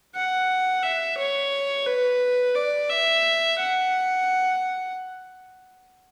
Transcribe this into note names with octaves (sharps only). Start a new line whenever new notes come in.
F#5
E5
C#5
B4
D5
E5
F#5